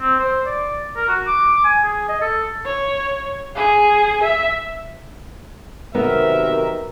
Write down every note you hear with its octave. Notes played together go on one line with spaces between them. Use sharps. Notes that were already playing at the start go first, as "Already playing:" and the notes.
C4
C5
D5
A#4
F#4
D6
G#5
G#4
D#5
A4
C#5
G#4
E5
B1 C3 D#3 B3 A#4 E5